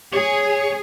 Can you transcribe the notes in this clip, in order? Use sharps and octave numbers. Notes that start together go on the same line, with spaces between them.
G#4 C#5